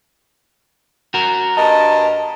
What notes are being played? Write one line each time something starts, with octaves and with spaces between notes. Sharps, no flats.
F#4 A#4
G2 A#3 D#5 A5